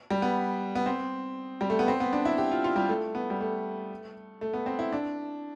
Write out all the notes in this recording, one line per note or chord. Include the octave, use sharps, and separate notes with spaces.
G3
B3
B3
C4
G3
A3
B3
C4
B3
D4
E4
G4
F4
F4
G3
A3
B3
G3
A3
A3
B3
C4
E4
D4